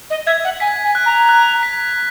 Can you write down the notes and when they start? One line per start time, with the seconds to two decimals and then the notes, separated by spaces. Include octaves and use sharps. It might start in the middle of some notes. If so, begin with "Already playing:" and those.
0.10 D#5
0.26 E5 G#6
0.44 F#5
0.60 G#5 B6
0.84 G#5
0.95 F#6
1.05 A#5
1.29 F#6
1.63 B6